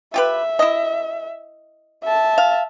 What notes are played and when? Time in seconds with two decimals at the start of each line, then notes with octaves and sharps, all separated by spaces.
0.14 F4 G4 B4 E5
0.59 E4 D#5
2.03 E5 A5
2.38 F5